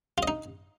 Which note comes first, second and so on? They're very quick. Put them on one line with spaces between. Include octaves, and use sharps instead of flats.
F4 D#5 D#4